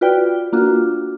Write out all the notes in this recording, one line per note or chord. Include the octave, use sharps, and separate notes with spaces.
F4 F#4 B4 D5 G5
A#3 D4 F4 F#4